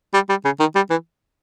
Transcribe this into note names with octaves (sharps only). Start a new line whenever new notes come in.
G3
G3
C#3
D#3
G3
E3